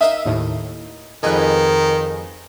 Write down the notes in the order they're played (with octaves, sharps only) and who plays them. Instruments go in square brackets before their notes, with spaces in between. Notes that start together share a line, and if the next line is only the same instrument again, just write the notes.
[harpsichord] D#4 A#4 F5 [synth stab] E5
[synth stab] D#2 A2
[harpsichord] F2 G#2 [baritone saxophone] D#3 [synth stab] B4 G#5